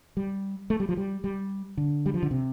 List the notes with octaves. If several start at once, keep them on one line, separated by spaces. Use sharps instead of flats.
G3
A3
G3
F3
G3
G3
D3
G3
F3
D3
C3